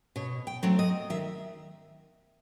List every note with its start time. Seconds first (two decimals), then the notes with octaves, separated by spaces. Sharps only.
0.16 B2 C#5
0.47 G5
0.63 F#3 A3 C4
0.79 D#5
1.10 D#3 E5